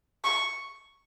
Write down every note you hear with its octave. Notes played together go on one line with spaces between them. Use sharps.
C#6